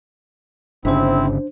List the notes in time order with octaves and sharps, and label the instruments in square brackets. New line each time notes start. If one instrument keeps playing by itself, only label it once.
[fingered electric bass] G1 C#3 [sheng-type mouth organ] C4 E4 [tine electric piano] D4 C5